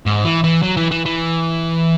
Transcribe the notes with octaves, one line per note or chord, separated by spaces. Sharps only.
G#2
E3
E3
F#3
E3
E3
E3